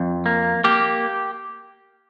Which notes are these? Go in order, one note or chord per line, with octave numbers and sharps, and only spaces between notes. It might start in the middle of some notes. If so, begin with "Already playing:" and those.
Already playing: F2
A#3
A#3 G4